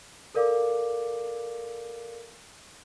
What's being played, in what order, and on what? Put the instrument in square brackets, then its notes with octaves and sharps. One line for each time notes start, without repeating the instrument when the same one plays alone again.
[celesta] A4 A#4 D5 F5 D6